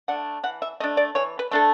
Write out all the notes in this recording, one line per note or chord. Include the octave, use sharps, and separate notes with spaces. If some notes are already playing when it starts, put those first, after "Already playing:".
A3 D4 F#5
E3 F#5
E5
A3 D4 D#5
D5
E3 C#5
B4
A3 D4 A4